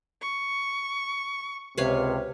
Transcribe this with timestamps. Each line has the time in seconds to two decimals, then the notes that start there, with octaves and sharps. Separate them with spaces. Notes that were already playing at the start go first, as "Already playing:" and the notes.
0.21 C#6
1.78 C#2 C3 B4 C#5 F5